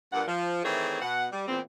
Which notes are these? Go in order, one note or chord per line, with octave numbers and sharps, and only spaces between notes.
G2 A#2 F#5
F3
D#3 E3 A3 C4 G#4 C#5
B2 F#5
G3
E2 A#2 C4